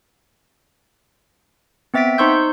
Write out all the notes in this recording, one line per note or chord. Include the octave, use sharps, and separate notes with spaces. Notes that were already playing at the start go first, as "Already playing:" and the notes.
B3 C4 E5 A6 B6 D7
D#4 C5 C6 C#6 E6 G6